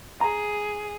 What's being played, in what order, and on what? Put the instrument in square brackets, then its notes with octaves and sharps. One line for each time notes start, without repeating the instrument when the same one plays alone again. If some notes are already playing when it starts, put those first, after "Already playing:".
[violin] G#4 [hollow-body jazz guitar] A#5